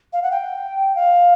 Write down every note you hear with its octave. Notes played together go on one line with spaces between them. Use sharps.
F5
F#5
G5
F5